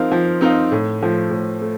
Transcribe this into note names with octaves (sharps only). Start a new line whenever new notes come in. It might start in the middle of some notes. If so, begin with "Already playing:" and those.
Already playing: F3 C4 D#4 A#4 F5
F3
C4 D#4 A#4 F5
A2
F3 A3
A2
A3